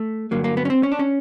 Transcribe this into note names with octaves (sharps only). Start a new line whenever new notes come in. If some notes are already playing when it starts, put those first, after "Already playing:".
Already playing: A3
G2 D3 F#3 A#3
A#3
B3
C#4
C4
C#4
D4
C#4